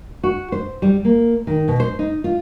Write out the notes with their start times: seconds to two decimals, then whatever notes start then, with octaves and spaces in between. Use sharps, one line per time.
0.24 F#4
0.52 C5
0.82 G3
1.05 A#3
1.47 D#3
1.68 B2
1.80 C5
1.99 D#4
2.24 F4